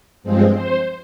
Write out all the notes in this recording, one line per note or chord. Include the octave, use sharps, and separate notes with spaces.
G2 F3 G#3 C4
C5